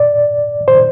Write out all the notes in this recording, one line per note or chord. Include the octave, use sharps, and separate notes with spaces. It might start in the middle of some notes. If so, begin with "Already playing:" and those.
Already playing: D5
C5